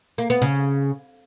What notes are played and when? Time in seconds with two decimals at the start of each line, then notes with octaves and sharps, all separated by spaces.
0.18 A#3
0.30 B3
0.42 C#3